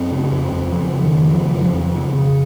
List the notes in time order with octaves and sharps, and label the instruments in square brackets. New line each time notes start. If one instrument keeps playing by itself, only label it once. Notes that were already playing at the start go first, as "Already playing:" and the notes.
Already playing: [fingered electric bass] F#2 C4
C#3
F2
F2
C#3 F3
C#3
D#3
F2
C#3 F3
F3
F2
F3
F2
C#3
C#3